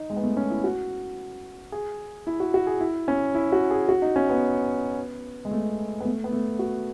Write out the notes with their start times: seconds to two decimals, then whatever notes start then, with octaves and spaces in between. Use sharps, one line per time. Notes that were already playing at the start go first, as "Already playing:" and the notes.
Already playing: D#4
0.10 G#3
0.16 B3
0.23 A3
0.37 C#4
0.50 E4
0.64 F#4
1.72 G#4
2.27 E4
2.40 F#4
2.54 F#4
2.67 G#4
2.80 E4
3.08 C#4
3.35 E4
3.52 F#4
3.71 G#4
3.89 F#4
4.02 D#4
4.16 C#4
4.29 B3
5.45 G#3
5.51 A3
6.00 B3
6.05 A3
6.24 B3
6.33 A3
6.59 F#4